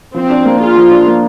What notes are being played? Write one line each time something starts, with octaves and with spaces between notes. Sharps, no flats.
F3 C4
D4
A#3
F4 G#4
F3
D4
A#3